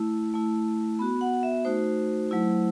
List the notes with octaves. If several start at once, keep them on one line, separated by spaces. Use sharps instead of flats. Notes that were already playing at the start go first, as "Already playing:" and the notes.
Already playing: A3 E4
A3 E4
B3 F#4 B5
F#5
E5
A3 D#4 F#4 C5
F#3 A3 E4